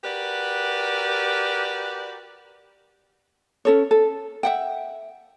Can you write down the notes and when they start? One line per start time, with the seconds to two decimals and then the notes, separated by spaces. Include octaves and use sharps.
0.04 F#4 G4 A#4 B4 D5
3.65 C#4 A4 C#5
3.91 A4
4.43 E5 F#5 G5